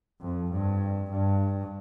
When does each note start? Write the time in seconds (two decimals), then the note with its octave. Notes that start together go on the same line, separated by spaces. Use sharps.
0.22 F2
0.52 G2
1.11 G2